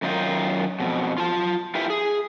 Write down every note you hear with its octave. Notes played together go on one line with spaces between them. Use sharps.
F#2 D#3 D#4 F4
F2 B2
F4 A5
E4 F4 G4 B4 E5
G#4